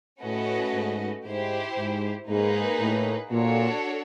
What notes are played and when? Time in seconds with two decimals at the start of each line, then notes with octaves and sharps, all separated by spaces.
0.22 A2 A3 C#4 F#4 B4 D#5
0.74 G#2
1.25 G#2 E4 G4 C5
1.77 G#2
2.28 G#2 A#3 D#4 G#4 B4
2.79 A2
3.31 A#2 D4 F#4 A4 C#5